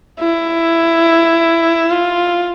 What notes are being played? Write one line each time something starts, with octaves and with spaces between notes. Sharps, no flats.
E4
F4